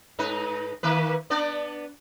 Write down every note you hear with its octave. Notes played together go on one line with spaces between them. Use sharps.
G#2 D#4 B4
D#3 A#3 B4
B3 D4 D5